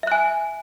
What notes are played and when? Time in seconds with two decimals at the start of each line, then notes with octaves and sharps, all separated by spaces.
0.03 E5
0.07 F#6
0.12 G#5